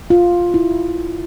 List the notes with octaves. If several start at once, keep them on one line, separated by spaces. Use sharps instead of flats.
F4
E4